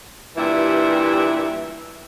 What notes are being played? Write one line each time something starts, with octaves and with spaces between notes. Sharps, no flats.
G2 A#2 E3 G3 E4 E5